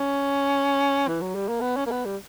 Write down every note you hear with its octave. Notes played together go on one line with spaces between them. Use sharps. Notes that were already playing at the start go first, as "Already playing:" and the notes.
Already playing: C#4
E3
F#3
G3
A#3
B3
C#4
A#3
B3
G3